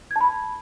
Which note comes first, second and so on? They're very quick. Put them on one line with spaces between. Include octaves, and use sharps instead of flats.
G#6 A5 B5